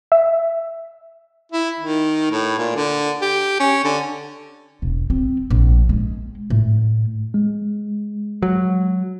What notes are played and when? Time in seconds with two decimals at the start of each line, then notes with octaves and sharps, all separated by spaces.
0.12 E5
1.52 E4
1.80 D#3
2.32 A2
2.58 A#2
2.76 D3
3.22 G4
3.60 C#4
3.84 D3
4.82 E1
5.10 C4
5.50 A#1
5.89 G#3
6.50 A2
7.34 G#3
8.42 F#3